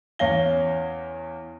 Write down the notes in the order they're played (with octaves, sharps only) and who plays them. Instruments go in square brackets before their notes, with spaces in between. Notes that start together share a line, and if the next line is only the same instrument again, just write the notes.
[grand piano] E2 C#4 C#5 F5 A#6 G7